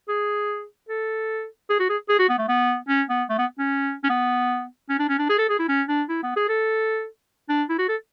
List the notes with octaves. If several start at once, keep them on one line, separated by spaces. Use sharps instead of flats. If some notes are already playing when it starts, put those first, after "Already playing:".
G#4
A4
G#4
F#4
G#4
G#4
F#4
B3
A3
B3
C#4
B3
A3
B3
C#4
C#4
B3
C#4
D4
C#4
D4
G#4
A4
G#4
E4
C#4
D4
E4
B3
G#4
A4
D4
E4
F#4
A4